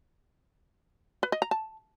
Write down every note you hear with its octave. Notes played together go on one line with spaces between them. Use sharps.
B4
D#5
A#5
A5